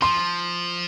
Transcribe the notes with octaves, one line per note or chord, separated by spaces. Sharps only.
F3 C6